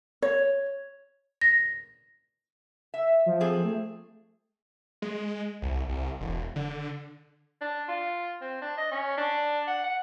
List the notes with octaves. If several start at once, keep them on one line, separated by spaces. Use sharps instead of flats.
C#5
A#6
E5
F3
C4 G#4 A4
A3
G#3
C2
C2
E1
D3
D4
F4
C4
D4
D#5
C#4
D4
F#5
F#5